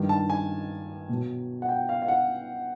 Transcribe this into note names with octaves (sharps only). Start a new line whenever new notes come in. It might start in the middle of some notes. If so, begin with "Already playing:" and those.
Already playing: G2 D#3 G3
A5
G#5
B2 F#3
F#5
G5
F5
F5
F#5